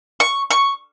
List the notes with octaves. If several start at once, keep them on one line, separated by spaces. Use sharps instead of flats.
C#6
C#6